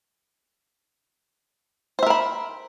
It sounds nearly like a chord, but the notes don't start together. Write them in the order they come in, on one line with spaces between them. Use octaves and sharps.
C5 E5 A#4 B5